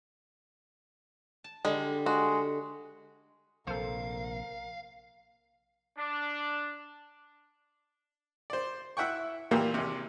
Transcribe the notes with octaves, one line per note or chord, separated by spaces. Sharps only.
A5
D3 G3 G#3
G#3 F#4
A#1 C3 A4 A#4 C5 F5
D4
C5 D5
E4 E5 F#5 G5 C#6
A#2 E3 A#3 G4
G#1 C3